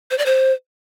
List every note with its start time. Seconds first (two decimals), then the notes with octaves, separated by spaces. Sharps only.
0.11 C5
0.18 D5
0.26 C5